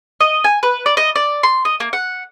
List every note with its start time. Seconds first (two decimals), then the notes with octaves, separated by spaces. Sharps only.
0.21 D#5
0.44 G#5
0.63 B4
0.86 D5
0.97 D#5
1.16 D5
1.43 C6
1.65 D#5
1.80 A#3
1.93 F#5